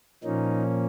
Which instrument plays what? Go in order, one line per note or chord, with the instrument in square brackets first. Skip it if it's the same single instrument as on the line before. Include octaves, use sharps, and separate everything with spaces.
[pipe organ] A#2 F3 A#3 C#4 D#4